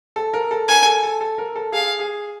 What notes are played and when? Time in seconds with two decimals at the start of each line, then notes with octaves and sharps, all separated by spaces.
0.16 A4
0.33 A#4
0.51 A4
0.68 A#4 G#5
0.86 A4
1.03 A4
1.21 A4
1.38 A#4
1.55 A4
1.72 G#4 F5
1.99 G#4